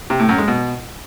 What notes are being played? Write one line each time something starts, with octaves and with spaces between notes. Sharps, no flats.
C3
A2
F#2
G#3
B2